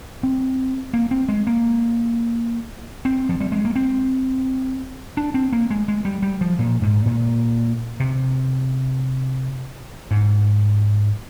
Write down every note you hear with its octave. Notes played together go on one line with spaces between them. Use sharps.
C4
A#3
C4
G#3
A#3
C4
F3
G3
G#3
A#3
C4
D4
C4
A#3
G#3
G#3
G3
G3
F3
A#2
G#2
A#2
C3
G#2